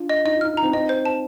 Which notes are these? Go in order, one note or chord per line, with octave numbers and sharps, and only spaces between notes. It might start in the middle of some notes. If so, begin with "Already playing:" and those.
Already playing: D4 F4
D#5
D#4 D#5
F4
D#4 F6
F4
A#5
C4 D#4
C4 D#4 D#5
C5
A5